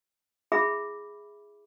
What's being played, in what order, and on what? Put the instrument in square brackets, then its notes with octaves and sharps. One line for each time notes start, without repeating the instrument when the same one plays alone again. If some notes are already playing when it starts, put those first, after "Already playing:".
[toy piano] E4 G#4 E5 B5 D6